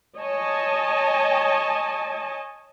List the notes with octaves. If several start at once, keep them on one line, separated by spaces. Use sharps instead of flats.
C#5 D#5 G#5 A5